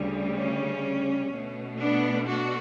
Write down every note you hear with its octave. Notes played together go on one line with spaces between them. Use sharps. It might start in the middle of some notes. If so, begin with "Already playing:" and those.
Already playing: D2 C#3 G3
C#4
B2 A3
B3 D4
D4 F#4